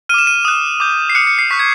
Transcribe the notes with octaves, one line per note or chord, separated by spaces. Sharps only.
D6 F6 D#7 E7
D#7
D#6 F#6
D6 G6
C7
D#6 F#6 C#7
C#7
C7
C#6 F#6 B6
G#6